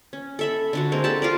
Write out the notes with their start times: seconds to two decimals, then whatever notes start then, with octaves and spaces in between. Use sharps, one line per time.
0.13 C#4
0.39 A4 E5 B5
0.73 D3 D4 F#4
0.92 G#3 A#3 C4
1.04 G4 A4 F#5 A5
1.22 F4 A#4 D5